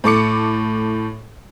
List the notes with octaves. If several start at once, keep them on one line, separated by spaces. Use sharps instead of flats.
A2 A4 D6 C#7